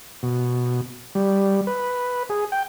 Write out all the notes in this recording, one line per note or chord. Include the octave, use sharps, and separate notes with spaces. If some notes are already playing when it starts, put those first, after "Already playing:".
B2
G3
B4
G#4
G5